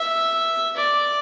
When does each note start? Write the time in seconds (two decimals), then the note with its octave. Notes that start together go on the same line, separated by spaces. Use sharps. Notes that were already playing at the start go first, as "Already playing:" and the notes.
Already playing: E5
0.76 D5